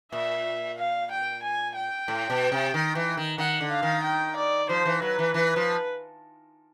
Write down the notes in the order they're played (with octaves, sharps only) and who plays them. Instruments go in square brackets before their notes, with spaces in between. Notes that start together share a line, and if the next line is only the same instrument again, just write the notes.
[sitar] A#2 [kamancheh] E5
[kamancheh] F5
G5
G#5
G5
[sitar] A2
B2
C3
D#3
E3
D#3
[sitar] D#3 [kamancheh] F#5
[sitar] D3
[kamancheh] F5
[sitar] D#3
[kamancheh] G5
D5
[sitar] F3 [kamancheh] C5
[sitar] E3
[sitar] F#3 [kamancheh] B4
[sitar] E3
E3
F3